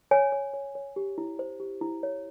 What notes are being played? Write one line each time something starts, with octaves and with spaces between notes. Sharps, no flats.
C#5 G#5
C#5
C#5
C#5
G4
E4
C5
G4
E4
C#5